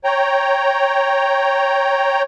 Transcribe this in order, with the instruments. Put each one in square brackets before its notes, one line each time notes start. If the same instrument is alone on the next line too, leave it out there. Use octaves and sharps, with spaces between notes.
[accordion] C#5 G5 A#5